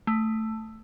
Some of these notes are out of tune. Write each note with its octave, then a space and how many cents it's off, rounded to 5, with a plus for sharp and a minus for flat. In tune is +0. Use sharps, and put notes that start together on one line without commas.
A3 +5